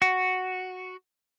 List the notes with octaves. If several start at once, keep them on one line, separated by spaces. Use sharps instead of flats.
F#4